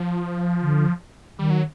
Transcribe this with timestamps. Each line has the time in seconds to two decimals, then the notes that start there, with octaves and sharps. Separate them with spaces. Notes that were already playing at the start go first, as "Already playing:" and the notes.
Already playing: F3
0.62 D3
1.39 D#3 G3
1.50 F#3